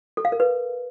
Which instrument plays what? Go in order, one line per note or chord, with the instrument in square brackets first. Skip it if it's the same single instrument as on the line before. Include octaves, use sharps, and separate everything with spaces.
[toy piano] A4
F5
A#4
B4